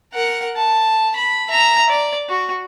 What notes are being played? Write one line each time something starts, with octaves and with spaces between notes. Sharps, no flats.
A#4 F#5
A5
B5
E5 A#5
D5
F#4